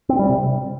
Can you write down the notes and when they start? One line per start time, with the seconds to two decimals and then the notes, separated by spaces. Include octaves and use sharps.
0.09 C4
0.19 G3
0.29 C3